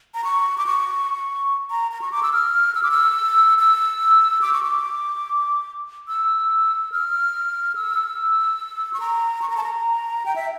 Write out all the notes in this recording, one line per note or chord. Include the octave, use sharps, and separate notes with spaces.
A#5
C#6
D6
C#6
A#5
A#5
C#6
D6
E6
F6
E6
D6
E6
E6
D6
C#6
D6
E6
F6
E6
C#6
A#5
C#6
A#5
A5
A#5
G5
E5